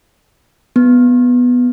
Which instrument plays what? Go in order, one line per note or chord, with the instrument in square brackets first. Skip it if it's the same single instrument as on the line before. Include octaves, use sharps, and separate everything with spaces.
[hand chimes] B3